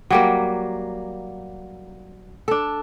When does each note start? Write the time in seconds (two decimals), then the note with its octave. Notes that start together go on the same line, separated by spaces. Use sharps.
0.10 F#3 G3 A#3
2.48 D4 A4